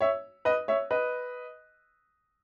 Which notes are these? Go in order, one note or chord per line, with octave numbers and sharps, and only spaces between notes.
C#5 E5
B4 D#5
C#5 E5
B4 D#5